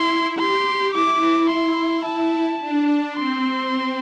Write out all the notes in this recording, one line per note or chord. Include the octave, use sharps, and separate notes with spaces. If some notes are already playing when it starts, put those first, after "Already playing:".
Already playing: E4 C6
G4 C6
E4 D6
C6
A5
D4
C4 C6